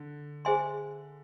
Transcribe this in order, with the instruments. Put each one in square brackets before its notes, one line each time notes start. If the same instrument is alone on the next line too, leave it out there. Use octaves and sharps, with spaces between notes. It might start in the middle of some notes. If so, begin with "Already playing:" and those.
Already playing: [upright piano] D3
[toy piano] G#4 C5 E5 G#5 C6